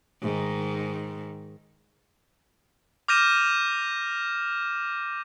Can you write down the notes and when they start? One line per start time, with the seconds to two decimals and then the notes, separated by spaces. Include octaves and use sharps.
0.22 G#2 D#3
3.08 D6 F6 G6 A#6 D#7 E7